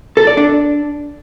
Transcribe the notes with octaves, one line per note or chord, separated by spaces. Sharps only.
A4
D5
D4